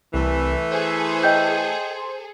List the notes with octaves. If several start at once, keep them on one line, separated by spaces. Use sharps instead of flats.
C2 E3 A3
G#4 A4 C5
D#5 G5 G6